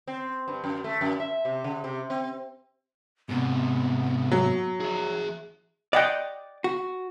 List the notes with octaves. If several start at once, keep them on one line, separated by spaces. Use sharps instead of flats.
C4
G2
F#2
A3
F#2
E5
C3
C#3
C3
C4
G#2 C3 B3
F#3
G#4 E5
D5 D#5 F#5 G5
F#4